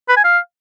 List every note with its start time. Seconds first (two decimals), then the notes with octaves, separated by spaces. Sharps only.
0.09 B4
0.17 G#5
0.24 F5